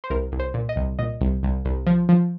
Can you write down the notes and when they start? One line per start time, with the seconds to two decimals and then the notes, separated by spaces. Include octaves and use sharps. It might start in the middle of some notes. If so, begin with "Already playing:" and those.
0.04 C5
0.10 C2 A#4
0.32 C2
0.39 C5
0.54 A#2
0.69 D#5
0.76 C2
0.99 A#2 D#5
1.21 C2
1.43 C2
1.65 C2
1.87 F3
2.09 F3